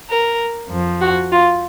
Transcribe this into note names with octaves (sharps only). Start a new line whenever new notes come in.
A#4
F2 F3
F#4
F4